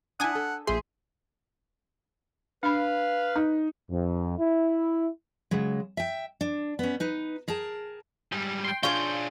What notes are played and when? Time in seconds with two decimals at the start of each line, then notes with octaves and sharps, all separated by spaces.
0.20 D4 E4 F#5 G#5 D#6
0.35 A4
0.67 A#1 G#4 C5 E5 C6
2.63 D4 B4 F5 B5
3.36 D#4
3.90 F2
4.38 E4
5.51 C#3 F#3 G#3
5.97 E5 G5
6.41 D4
6.79 B3 C#4
7.00 D#4 B4
7.48 G#4 A#4 G5 A5
8.32 G#2 G3
8.64 G5 C6
8.83 D4 F4 G#4 C#5 F5 G6